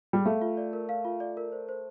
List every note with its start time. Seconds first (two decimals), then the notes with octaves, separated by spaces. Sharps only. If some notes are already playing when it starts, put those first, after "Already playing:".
0.13 G3
0.26 A3 F5
0.41 F4
0.57 D5
0.73 A#4
0.89 F5
1.05 F4
1.20 D5
1.37 A#4
1.52 C5
1.69 C5